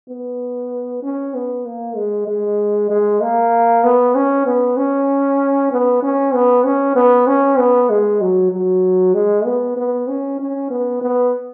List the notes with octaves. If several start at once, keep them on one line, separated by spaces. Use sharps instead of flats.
B3
C#4
B3
A#3
G#3
G#3
G#3
A#3
B3
C#4
B3
C#4
B3
C#4
B3
C#4
B3
C#4
B3
G#3
F#3
F#3
G#3
B3
B3
C#4
C#4
B3
B3